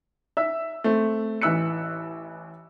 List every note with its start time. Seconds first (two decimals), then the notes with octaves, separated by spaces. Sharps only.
0.37 E5 E6
0.84 A3 C4
1.41 A1 E3 E5 E6 F#6 C#7